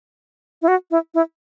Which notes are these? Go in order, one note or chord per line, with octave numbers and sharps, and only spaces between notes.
E4
F#4
E4
E4